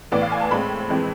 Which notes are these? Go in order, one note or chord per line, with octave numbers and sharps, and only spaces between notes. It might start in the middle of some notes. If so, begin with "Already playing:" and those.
A2 E3 B3 D5
F5
G#5
A5
A2 G#3 C4 B5
F2 E3 G#3 C4